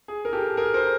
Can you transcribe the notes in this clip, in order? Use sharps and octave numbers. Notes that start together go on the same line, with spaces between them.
G#4
A#4
G4 A4
G#4 A#4
A#4 C5